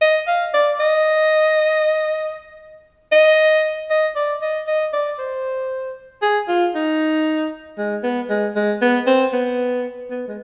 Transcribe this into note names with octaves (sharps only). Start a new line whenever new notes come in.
D#5
F5
D5
D#5
D#5
D#5
D5
D#5
D#5
D5
C5
G#4
F4
D#4
G#3
B3
G#3
G#3
B3
C4
B3
B3
G#3